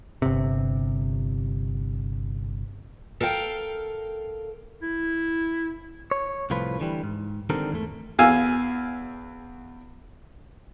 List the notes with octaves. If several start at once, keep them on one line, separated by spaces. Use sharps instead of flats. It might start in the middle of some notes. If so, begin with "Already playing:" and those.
G1 C3
A4 A#4 F5 G5
E4
C#5
C2 A2 F3 F4 B4
D3 E3 G3
G#2
D3 D#3 G3 C4 A4 A#4
E2 G#2 A3
E2 F5 G#5 E6